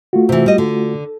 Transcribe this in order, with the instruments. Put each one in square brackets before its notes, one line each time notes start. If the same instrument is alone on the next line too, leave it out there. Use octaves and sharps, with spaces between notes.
[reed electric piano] A3 F4 F#4
[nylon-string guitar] C3 E3
G3 D#5
D3